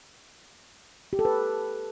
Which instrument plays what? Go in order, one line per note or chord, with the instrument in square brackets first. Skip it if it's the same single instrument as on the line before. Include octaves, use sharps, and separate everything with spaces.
[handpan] G4
A4
B4